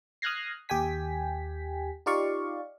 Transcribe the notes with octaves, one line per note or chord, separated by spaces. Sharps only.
D#6 F6 F#6 G#6 A#6 C7
D#2 G4 G5 G#5 B6
D#4 F4 G4 D5 F5 C#6